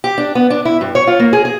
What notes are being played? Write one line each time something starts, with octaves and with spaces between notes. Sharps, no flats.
G4
D4
B3
D4
E4
G2
C#5
F4
A#3
G#4
G#4